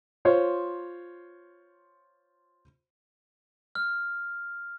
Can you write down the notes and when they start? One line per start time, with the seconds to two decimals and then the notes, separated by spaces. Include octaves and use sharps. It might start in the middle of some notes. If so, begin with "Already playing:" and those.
0.25 F4 C5 C#5
3.75 F6